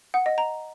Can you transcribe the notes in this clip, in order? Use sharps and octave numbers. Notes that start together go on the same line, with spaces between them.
F#5
D#5
A#5